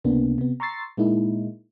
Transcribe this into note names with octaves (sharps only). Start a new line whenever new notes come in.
C#2 C3 A#3 B3 D4
C3 B3
A#5 C6 C#6 E6 A6 C7
A#2 G#3 A#3 D#4 E4